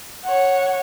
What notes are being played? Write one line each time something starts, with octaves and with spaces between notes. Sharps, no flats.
C#5 F#5